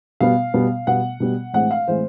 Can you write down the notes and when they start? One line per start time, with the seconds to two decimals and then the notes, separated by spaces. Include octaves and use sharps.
0.20 B2 G3 B3 F5
0.54 B2 G3 B3
0.87 B2 G3 B3 F#5
1.20 B2 G3 B3
1.53 A2 E3 G#3 C4 F#5
1.71 F5
1.88 A2 E3 G#3 C4 C5